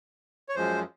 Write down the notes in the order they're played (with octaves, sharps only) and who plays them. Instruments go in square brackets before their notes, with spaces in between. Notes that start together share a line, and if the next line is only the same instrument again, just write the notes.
[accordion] C#5
F#2 F3 G#3 C5